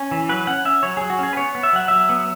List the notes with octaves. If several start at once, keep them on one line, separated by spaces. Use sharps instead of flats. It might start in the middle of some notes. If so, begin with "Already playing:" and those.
Already playing: C#4
E3
F#3 B4
C#4 F#5
C#4 E5
F#3 C#5
F#3 G#4
F#4
C#4 G#4
B4
B3 C#5
B3
E5
F#3 F#5
F#3 E5
B3